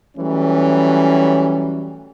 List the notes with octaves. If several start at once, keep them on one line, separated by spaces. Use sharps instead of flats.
E3 F#3 G3 A3 C#4